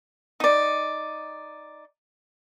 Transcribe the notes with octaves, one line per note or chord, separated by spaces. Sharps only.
D#4 D5